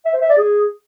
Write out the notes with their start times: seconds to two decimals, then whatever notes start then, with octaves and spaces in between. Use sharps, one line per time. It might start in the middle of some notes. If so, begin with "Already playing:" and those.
0.05 E5
0.13 C5
0.21 E5
0.29 D5
0.37 G#4